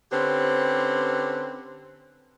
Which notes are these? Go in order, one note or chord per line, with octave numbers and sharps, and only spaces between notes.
D3 C4 C#4 G4 B4